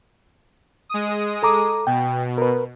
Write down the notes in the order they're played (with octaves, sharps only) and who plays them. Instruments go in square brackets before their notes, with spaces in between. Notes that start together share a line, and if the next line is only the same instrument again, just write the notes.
[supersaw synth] G#3 D#6
[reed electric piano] A4 A#5 D6
[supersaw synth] B2 [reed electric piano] G5
[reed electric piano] A#4 B4